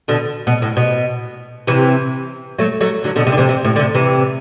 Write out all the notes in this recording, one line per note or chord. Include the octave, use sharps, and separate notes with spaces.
B2 D3
B2
A2
B2
C3 E3
F#3 A3
F#3 A3
D3 F#3
B2 D3
C3
D3
C3 E3
C3
A2
D3
C3
C3 E3